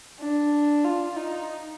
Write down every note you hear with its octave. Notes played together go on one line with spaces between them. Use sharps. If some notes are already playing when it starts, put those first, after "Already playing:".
D4
F4
D#4